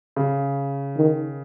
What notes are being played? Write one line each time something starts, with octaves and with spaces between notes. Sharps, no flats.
C#3
D#3